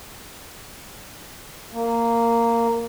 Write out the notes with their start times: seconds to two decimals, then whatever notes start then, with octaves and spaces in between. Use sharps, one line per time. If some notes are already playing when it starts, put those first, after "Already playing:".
1.72 A#3